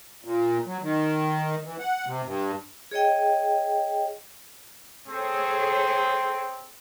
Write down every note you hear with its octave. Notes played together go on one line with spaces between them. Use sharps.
A#2
F#3
D#3
E3
F#5
C3
G2
G#4 C#5 D#5 G5
C4 G#4 A4 C#5